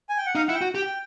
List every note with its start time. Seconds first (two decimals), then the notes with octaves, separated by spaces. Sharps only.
0.09 G#5
0.18 G5
0.26 F#5
0.35 D#4 F5
0.47 E4 F#5
0.55 G5
0.61 F#4
0.75 G4 G5